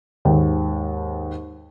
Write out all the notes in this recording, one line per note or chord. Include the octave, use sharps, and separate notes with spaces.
D#2 G#2